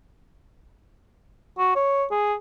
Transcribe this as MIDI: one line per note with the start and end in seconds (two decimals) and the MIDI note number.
1.59 1.73 66
1.76 2.05 73
2.11 2.35 68